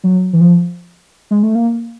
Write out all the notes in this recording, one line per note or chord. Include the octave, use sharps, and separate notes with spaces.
F#3
E3
F3
G#3
A3
A#3